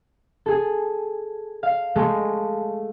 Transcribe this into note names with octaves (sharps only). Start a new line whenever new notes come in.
G#4 A4
F5
G#3 A3